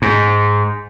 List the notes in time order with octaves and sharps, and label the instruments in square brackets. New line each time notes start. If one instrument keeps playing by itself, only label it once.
[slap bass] G#2